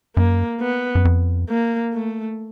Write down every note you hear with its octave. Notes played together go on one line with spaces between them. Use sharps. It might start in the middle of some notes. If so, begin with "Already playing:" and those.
F#2 A#3
B3
F#2
F2
A#3
A3